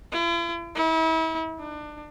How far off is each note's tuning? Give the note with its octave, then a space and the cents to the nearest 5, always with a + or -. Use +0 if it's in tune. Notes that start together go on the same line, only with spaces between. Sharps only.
E4 +45
E4 -35
D4 +30